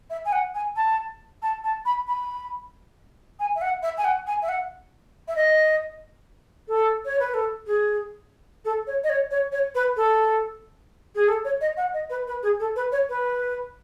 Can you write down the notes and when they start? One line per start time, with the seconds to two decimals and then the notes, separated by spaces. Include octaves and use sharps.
0.10 E5
0.25 G#5
0.32 F#5
0.54 G#5
0.76 A5
1.42 A5
1.63 A5
1.85 B5
2.07 B5
3.39 G#5
3.55 E5
3.61 F#5
3.82 E5
3.97 G#5
4.04 F#5
4.26 G#5
4.42 E5
4.48 F#5
5.28 E5
5.36 D#5
6.68 A4
7.05 C#5
7.19 B4
7.34 A4
7.66 G#4
8.65 A4
8.87 C#5
9.03 D#5
9.09 C#5
9.30 C#5
9.52 C#5
9.75 B4
9.96 A4
11.15 G#4
11.28 A4
11.44 C#5
11.61 D#5
11.77 F#5
11.93 D#5
12.10 B4
12.27 B4
12.42 G#4
12.59 A4
12.76 B4
12.92 C#5
13.09 B4